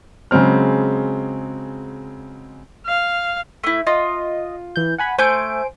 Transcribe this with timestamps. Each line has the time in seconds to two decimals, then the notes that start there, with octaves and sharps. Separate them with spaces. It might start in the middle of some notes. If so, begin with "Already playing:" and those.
0.31 C#3 F#3 G#3 C4 F6
2.86 F5
3.64 A3 E4
3.87 F4 D#5
4.76 E3 G6
4.98 F#5 G#5 B5
5.18 A3 C5 G#5 G6 D7